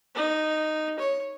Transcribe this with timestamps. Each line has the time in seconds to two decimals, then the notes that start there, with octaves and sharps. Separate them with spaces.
0.15 D#4
0.99 C#5